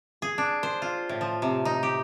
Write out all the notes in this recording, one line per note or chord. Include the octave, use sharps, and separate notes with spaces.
G#4
D4
C5
F4
A2
F3
C3
D#4
G4